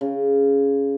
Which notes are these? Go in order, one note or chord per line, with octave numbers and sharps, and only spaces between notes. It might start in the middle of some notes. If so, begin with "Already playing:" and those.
C#3 C#4